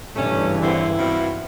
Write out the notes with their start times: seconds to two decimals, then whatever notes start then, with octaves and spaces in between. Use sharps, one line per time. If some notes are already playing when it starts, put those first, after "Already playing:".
0.16 G2 C#3 E3 A3 C#4
0.62 D3 B3 C4 E4
0.99 B2 F3 C4